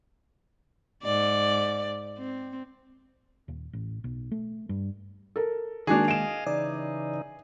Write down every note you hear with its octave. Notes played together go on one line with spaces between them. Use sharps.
G#2 D5
C4
D#1
A1
B1
A3
G2
A4 A#4
D#3 G#3 A#3 D4 F#4 G#4
D#5 F5 D7 E7
C#3 E3 D#4 D5